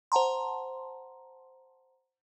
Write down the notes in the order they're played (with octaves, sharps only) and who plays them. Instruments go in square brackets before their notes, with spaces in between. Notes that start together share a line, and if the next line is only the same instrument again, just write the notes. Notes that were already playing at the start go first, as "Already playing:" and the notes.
[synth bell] C5 F#5 A5 A#5 C6